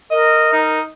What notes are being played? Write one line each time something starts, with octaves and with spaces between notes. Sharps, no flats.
A#4 D#5
D#4